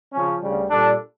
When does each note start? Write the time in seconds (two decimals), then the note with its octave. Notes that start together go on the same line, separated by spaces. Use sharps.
0.13 C#3 F3 C#4
0.41 D2 C#3 G3
0.69 A#2 G3 D4 A4